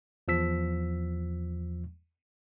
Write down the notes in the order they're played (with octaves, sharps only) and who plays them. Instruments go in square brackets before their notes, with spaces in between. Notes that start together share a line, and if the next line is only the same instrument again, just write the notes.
[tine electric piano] E2 F3 E6 B6